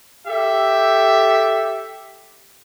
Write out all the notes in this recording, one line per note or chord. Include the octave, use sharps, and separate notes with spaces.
G4 A4 E5